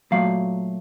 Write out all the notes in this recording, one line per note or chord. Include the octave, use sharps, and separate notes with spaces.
A#2 F#3 A3 F5